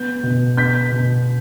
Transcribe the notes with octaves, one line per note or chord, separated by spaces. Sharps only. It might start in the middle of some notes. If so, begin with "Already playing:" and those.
Already playing: B3 G6
B2
B3 G6 B6
B2